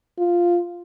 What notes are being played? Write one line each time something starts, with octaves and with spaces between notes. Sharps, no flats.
F4